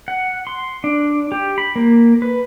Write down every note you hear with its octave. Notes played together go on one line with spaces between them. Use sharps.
F#5
C6
D4
G4
B5
A#3
B4